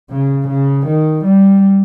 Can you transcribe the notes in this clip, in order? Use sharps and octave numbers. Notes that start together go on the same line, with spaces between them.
C#3
C#3
D#3
G3